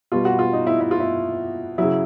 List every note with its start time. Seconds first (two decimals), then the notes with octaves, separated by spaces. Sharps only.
0.12 B2 G3 F4
0.25 F#4
0.39 F4
0.53 D#4
0.67 E4
0.81 E4
0.91 F4
1.00 E4
1.78 C#3 F#3 E4